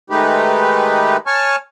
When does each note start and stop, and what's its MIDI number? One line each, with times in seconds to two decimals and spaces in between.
0.10 1.17 51
0.10 1.17 56
0.10 1.17 57
0.10 1.17 63
0.10 1.17 67
0.10 1.17 71
1.27 1.56 73
1.27 1.56 80
1.27 1.56 81
1.27 1.56 85
1.27 1.56 89